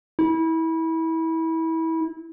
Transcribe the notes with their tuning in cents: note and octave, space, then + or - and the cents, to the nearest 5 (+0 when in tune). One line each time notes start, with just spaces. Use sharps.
E4 -25